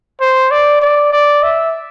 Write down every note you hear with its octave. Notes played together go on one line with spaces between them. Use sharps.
C5
D5
D5
D5
E5